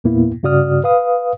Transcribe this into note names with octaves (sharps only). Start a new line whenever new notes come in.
E2 A#2 A#3 B3 E4
G2 C#3 F#4 D5 D#6 F6
B4 F5 D#6